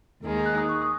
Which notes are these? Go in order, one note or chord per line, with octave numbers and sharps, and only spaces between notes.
D#2 D#3 G#3 D#4
F#6
D#6
C#6
D#6